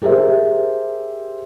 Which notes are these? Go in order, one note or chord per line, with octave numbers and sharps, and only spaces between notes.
G4 G#4 A#4 C5 E5